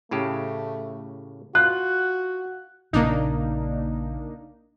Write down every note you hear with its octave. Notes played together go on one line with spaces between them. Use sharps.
A2 C#3 A3 G4
F4 F#4 F#6
A#1 A#2 C#3 A#3 D4 D#4